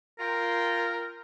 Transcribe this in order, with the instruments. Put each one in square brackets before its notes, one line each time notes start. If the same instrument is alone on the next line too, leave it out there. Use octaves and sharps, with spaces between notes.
[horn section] F4 G5 [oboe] A#4